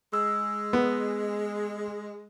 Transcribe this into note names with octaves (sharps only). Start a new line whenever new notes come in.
G#3 E6
B3